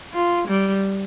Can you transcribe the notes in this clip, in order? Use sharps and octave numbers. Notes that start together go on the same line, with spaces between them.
F4
G3